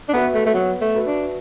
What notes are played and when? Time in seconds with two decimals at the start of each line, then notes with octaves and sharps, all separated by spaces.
0.09 D4
0.13 B3 F#4 B4 E5
0.34 A3
0.46 A3
0.54 F#3 B3
0.81 A3
0.95 F#4 B4 E5
1.07 D4